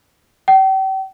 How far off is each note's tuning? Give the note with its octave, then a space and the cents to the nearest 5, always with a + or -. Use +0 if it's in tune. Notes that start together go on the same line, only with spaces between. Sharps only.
G5 -40